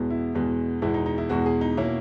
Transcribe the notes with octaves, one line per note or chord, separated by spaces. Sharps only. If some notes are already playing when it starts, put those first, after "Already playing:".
Already playing: E2 B2 G#3 B3
E4
E2 B2 G#3 B3
E2 B2 G#3 B3 E4
D#4
D#4
E4
E2 B2 G#3 B3 F#4
G#4
D#4
B2 A#3 C#4 E4